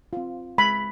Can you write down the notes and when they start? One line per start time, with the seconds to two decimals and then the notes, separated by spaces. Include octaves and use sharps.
0.13 C4 F4
0.58 G#3 B5